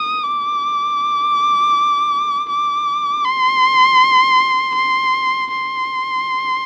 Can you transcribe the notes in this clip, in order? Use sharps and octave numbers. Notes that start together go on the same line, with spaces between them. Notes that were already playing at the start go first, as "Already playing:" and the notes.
Already playing: D#6
D6
D6
C6
C6
C6